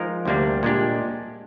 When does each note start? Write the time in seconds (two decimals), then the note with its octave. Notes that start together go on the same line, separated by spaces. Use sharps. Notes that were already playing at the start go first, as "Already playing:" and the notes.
Already playing: F3 G#3 D#4 A#4
0.25 D2 C3 G3 A#3 D4
0.63 A#2 G#3 D4 G4